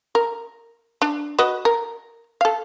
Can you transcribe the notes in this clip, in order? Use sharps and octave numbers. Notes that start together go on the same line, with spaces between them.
A#4
D4
F#4 B4 D#5
A#4
A4 F5